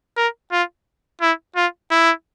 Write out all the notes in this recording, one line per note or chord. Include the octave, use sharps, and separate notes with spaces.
A#4
F4
E4
F4
E4